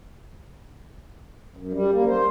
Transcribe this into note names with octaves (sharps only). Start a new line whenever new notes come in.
F#2
G3
A#3
C5